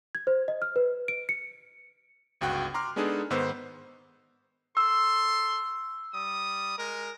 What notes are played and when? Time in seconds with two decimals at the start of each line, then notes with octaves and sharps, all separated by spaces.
0.15 G#6
0.27 C5
0.48 D#5
0.62 F6
0.76 B4
1.08 D7
1.29 C#7
2.41 G1 C#2 F#4 G5 F#6
2.74 A#5 C6 D6 F6
2.96 G#3 B3 D4 D#4 G#4 A4
3.30 G#2 D#3 B3 C5 E6
4.77 A4 C6 E6
6.13 G3 D#6
6.79 G#3 A#4